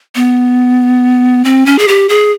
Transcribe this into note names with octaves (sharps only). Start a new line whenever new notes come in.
B3
C4
C#4
G#4
G4
G#4